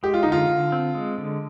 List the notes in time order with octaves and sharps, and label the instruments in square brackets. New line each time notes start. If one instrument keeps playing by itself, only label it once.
[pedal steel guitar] G#3 [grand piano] G4
[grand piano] F4
[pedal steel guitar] D3 [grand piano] D#4
[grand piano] F4
[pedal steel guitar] D3
C4
G#3
D3